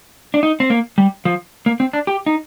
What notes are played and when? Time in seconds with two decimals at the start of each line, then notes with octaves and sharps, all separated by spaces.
0.34 D4
0.43 D#4
0.60 C4
0.70 A#3
0.98 G3
1.25 F3
1.66 A#3
1.80 C4
1.93 D4
2.07 G4
2.26 D#4